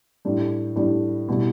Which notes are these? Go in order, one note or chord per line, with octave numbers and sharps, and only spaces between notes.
A2 G3 D4
A2 G3 D4
B2 G3 E4